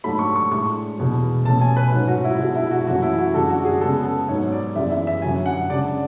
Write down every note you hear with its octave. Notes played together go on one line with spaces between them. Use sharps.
G#2 F#3 A3 D4 B5
C#6
C#6
A2 G#3 D4 C#6
E2 B2 G#3
B2 A3 C#4 A5
G#5
B4
G#2 F#3 C#4
F#4
E4
B2 G#3 D4 F#4
E4
F#4
F#2 E3 A3 C#4 F#4
E4
F#4
F#2 D3 G#3 D4 A4
F#4
G#4
C#3 G#3 B3 A4
A4
G#2 F#3 B3 C#5
D5
F#2 E3 G#3 B3 E5
E5
E5
F#2 D3 F#3 G#5
F#5
C#3 G#3 D4 D5